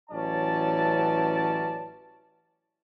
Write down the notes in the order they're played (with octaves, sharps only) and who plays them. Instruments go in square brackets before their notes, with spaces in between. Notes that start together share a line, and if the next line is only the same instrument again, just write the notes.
[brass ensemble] A1 E3 F#3 C#4 D5 A5